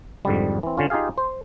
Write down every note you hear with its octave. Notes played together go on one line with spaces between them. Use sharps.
F2 G#2 D3 G3
E3 C4
D3 C#4 F4
D#4 F4 G4 G#4 F5
C5